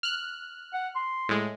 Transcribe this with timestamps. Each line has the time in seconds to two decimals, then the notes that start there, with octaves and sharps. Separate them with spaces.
0.03 F6 F#6
0.74 F#5
0.96 C6
1.29 A2 G#3